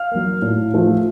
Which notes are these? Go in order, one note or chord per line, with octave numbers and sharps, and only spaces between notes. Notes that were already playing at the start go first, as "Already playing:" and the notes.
Already playing: F5 F6
F#3 A#3
A2
F3 A3